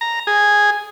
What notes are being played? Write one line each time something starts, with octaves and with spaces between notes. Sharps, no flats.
A#5
G#4